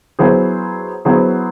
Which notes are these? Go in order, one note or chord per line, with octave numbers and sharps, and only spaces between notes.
F#3 B3 E4 G#4 C5
F#3 B3 E4 G#4 C5